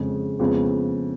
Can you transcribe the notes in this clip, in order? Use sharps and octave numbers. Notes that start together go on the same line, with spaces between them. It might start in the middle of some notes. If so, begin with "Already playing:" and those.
Already playing: F2 C#3 G#3
F2 C#3 G#3 B3 F4